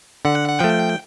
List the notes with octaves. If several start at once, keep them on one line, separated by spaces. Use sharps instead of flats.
D3 F#5
F#5
F3 A3 G5